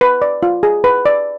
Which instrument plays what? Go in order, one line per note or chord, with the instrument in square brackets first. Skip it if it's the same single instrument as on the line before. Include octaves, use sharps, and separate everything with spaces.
[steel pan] B4
D5
F4
G#4
B4
D5